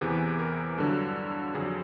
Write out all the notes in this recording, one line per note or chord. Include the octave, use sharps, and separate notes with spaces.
E2 C3 E3 G#4
A#4
G2 D3 F#3 A4
F2 D3 F#3 G#4